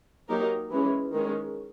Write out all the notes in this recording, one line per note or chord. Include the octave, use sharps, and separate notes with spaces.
F#3 A#3 D#4 G4 A#4
E3 G#3 C#4
D#3 G#3 C#4